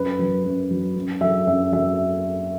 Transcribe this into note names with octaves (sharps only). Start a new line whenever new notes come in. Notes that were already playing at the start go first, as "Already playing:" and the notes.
Already playing: F#2 B4
F#3
F#2
F#3
F#2
F#3 E5
F#2 E5
F#3 E5